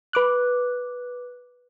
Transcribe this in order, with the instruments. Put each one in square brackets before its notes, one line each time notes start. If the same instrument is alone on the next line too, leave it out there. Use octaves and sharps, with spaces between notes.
[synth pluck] B4 D6 F#6